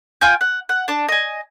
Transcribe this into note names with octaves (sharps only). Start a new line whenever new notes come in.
F4 G5 G#5 G6
F#5
F#5
D4 A5
D#5 G#5